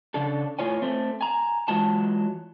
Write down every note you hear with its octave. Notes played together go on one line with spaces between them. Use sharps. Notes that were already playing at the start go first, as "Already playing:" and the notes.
C#3 D4 A4
A2 F4 C#5 G#5
A3 C4
G#5 A#5
E3 F#3 G#3 F4 F#4 A5